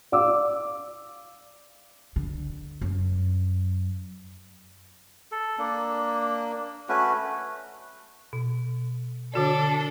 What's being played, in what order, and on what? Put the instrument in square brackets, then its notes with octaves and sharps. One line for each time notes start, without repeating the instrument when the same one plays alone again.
[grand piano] D5 F5 D6 E6
[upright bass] D3
F#2
[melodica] A4
A#3 D4
A3 C#4 F#4 B4
[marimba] B2
[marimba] D3 F#4 D5 [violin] D4 A4